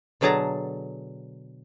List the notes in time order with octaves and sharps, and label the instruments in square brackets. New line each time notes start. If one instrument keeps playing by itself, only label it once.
[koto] B2 D3 F#3 G#4 A5 A#5